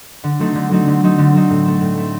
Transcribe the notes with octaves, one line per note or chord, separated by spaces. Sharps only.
D3
F#3 A3 C4 D#4
D3
F#3 A3 C4 D#4
D3
F#3 A3 C4 D#4
D3
F#3 A3 C4 D#4
A2
A3 C4
A2
A3 C4